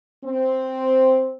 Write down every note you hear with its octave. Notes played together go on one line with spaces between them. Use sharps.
C4